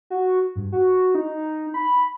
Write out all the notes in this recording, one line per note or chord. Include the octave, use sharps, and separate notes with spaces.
F#4
G2
F#4
D#4
B5